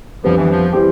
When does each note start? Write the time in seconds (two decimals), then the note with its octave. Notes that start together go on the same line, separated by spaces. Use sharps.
0.24 F2 D3 F3 G3 B3
0.37 E3
0.50 F3
0.72 E3 G3 C4 G4